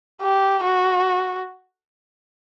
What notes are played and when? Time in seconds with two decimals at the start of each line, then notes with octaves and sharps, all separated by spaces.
0.22 G4
0.63 F#4